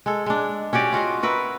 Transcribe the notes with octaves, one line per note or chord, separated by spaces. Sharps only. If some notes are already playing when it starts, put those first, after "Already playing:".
G#3 A4
G#3 D4
C#4 F#4 G4 D5
F4 F#4 D#5 F5
F#4 A#4 B4 E5